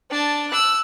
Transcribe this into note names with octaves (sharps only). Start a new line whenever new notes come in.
D4 A5
E6 F#6